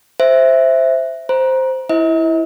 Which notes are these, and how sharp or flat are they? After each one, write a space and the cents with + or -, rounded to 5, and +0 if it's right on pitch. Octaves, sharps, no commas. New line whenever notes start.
C5 +0 E5 +0
C5 +0 A#5 +25
E4 +0 C5 +5 D#5 +45